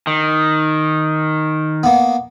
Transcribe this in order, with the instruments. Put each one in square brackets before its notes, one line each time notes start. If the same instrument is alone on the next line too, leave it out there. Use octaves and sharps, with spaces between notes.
[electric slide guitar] D#3
[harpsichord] A#3 B3